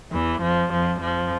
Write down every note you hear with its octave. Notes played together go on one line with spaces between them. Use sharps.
E2 E3
F2 F3
F2 F3
F2 F3